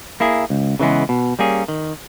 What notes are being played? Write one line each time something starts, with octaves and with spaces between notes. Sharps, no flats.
A#3 E4 G#4
C#2
C#3 E3 G#3 B3
B2
G3 A#3 C#4 G#4
D#3